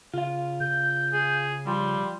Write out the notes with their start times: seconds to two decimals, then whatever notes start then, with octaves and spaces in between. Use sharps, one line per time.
0.14 C#3 F4 F5
0.60 C#3 G6
1.13 G#4
1.67 F3 G3 C6